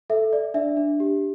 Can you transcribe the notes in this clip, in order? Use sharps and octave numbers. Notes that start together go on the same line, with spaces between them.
A4 E5
D5
D4 E5
D4
G4